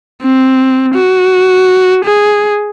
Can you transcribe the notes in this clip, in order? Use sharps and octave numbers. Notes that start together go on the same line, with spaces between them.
C4
F#4
G#4